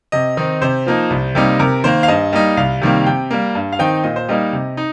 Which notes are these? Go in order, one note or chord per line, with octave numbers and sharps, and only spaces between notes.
C3 D#5
D#3 C4 D#4
C3 C5
F3 A#3 D#4
C2
C3 G3 A#3 D#4
C3 A#4
D#3 A#3 C5
F5
G2 D#5
G3 A#3 D#4
C2 F5
C3 D#3 G3 A#3
C3 G5
G3 A#3
G2
F5
D#3 C4 D#4 G5
A#2 D#5
C5
G3 A#3 D#4 D#5
C3
D#4